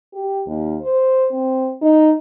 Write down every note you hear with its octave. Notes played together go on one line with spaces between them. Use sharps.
G4
D#2
C5
C4
D#4